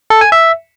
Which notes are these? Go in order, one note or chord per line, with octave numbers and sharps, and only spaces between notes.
A4
G#5
E5